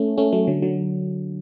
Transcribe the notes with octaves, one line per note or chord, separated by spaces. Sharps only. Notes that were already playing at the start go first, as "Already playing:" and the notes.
Already playing: A3 C#4
A3 C#4
F#3 A3
D3 F#3
D3 F#3